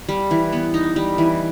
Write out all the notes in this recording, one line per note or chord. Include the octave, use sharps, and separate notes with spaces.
G3
E3
B3
D#4
G3
E3